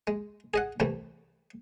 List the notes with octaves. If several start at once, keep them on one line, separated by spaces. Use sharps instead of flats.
G#3
G#4 D#5 F#5
C2 E3 G3 A3